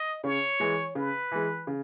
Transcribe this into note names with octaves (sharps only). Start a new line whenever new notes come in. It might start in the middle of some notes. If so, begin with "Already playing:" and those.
Already playing: D#5
C#3 C#5
E3 G#3
C#3 B4
E3 G#3
C#3